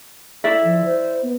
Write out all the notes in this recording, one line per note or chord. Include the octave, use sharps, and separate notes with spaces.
E4 A4 D5 E5
F3
C5
B3